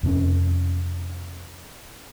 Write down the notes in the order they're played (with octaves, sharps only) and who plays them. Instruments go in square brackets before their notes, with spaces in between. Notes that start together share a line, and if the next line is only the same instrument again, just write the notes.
[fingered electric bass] F2 C3 B3 C#4